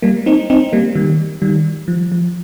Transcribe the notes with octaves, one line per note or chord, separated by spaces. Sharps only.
G3 A#3
C4 D#4
C4 D#4
G3 A#3
D#3 G3
D#3 G3
F3
F3